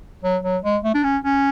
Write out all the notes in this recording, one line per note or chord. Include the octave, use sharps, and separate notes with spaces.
F#3
F#3
G#3
A3
D4
C#4
C#4